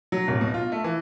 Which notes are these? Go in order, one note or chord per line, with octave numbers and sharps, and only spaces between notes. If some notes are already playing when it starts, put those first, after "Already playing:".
F#3
D1
B2
F4
A3
E3